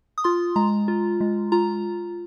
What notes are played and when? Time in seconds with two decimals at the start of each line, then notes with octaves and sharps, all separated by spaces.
0.18 D#6
0.24 F4 C6
0.56 G#3 A#5
0.88 F4
1.21 G#3
1.52 F4 A#5